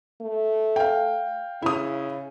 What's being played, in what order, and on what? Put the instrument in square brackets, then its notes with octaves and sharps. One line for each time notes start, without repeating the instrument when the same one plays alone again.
[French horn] A3
[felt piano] F5 G5
[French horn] C#3 [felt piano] E4 D#6